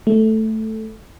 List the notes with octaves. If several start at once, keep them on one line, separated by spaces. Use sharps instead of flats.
A3